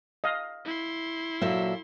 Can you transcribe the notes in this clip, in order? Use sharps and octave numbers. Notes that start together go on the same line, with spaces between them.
D#5 F5
E4 C6
A#2 F#3 A4 E5